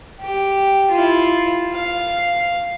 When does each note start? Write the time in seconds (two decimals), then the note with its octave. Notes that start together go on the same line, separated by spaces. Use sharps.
0.21 G4
0.91 E4 F4
1.74 F5